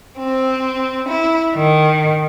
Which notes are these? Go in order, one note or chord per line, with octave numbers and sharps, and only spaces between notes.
C4
E4
D#3